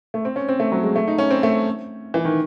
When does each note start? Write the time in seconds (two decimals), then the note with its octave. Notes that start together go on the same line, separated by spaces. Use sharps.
0.14 A3
0.25 C4
0.36 C#4
0.49 C4
0.60 A3
0.72 F#3
0.83 G#3
0.96 A3
1.08 D#4
1.18 C#4
1.30 C4
1.43 A3
2.14 E3
2.25 D#3